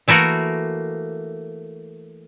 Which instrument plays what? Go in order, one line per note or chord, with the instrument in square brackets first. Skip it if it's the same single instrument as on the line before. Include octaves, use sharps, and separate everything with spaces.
[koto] E3 A3 A#3 F#4 A#4